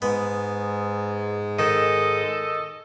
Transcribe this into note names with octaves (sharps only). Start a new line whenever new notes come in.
G#2 G#3 B3
D#3 A4 D#5